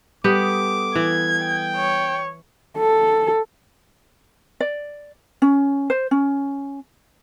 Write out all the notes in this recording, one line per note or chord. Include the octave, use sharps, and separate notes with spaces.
G3 B3 G4 A4 D6 D#6
E3 G#6
G5
C#5
A4
D5
C#4
C5
C#4